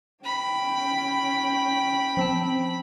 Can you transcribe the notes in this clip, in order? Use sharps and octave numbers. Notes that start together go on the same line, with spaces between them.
C#4 G5 B5
F3 C4 A5